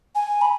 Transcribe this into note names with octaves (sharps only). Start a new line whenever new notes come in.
G#5
B5